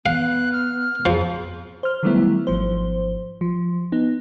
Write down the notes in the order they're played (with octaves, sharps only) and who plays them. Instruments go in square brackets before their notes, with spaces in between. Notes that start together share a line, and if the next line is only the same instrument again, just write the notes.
[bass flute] B3 [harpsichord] F5 [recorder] F#6
[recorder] F6
[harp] F2 [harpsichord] F3 [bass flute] G#4
[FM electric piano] C5 F6
D#3 F#3 G3 A3 B3 E4
G#1 F3 C5
F3
B3 D#4